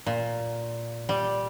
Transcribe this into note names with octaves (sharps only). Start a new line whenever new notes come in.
A#2
G3